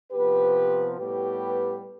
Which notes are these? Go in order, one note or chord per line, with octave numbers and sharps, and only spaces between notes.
C3 F3 B3 G4 B4
A2 G3 B3 G4 B4